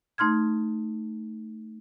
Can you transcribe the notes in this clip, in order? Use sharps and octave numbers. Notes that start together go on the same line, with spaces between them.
A3 D#4 C6 F6 G#6